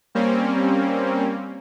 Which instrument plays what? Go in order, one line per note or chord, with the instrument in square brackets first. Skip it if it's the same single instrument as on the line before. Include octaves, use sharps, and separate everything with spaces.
[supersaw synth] G3 A#3 C4 C#4